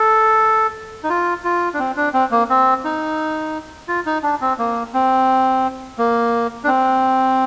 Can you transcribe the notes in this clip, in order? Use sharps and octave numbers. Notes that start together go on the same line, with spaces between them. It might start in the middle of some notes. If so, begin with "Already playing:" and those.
Already playing: A4
D#4
F4
F4
D4
C4
D4
C4
A#3
C4
D#4
F4
D#4
D4
C4
A#3
C4
A#3
D4
C4